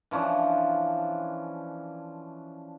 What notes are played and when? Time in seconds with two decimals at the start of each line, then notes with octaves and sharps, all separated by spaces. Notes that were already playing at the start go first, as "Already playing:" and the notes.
0.11 E3 F3 C#4 D4